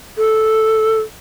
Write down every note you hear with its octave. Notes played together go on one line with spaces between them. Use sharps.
A4